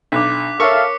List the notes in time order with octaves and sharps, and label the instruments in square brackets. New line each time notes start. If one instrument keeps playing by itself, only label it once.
[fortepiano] B1 [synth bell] D4 [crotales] D6 F#6 B6
[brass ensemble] A4 E5 F5 [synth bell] A#4 C#5 [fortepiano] C#6 [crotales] C#7